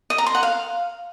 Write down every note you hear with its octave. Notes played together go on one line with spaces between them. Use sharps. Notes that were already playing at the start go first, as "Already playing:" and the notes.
D#5
A#5
C6
F#5
F5